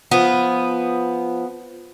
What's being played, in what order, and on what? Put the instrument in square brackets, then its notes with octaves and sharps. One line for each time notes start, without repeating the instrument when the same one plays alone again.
[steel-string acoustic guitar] F3 [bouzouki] B3